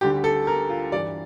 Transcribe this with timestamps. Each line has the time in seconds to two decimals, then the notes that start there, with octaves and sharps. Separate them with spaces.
0.01 D2 D3 G3 G4
0.24 A4
0.47 A#4
0.69 F4
0.92 G2 E3 G3 D5